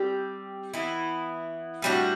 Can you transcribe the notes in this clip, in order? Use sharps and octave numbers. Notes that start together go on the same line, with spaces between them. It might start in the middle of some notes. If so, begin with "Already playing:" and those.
Already playing: G3 C4 G4
E3 B3 E4
A2 G3 D4 F#4